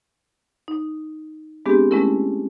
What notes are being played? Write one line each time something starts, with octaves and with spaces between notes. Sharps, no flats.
D#4
G#3 B3 C4 D4 G4 G#4
G#3 A3 C#4 E4 A#4